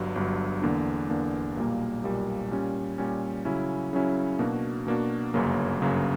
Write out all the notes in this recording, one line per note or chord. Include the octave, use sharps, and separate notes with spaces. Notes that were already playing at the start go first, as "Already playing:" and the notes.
Already playing: G1 G2 F#3
G1 G2 F#3
E2 D3 A#3 D4
E2 D3 A#3 D4
B1 A#2 G3 A#3
B1 A#2 G3 A#3
A#2 G3 C#4
A#2 G3 C#4
C#3 F#3 C#4 E4
C#3 F#3 C#4 E4
B2 A#3 D4 F#4
B2 A#3 D4 F#4
G1 F#2 C#3 F#3 A#3
G1 F#2 C#3 F#3 A#3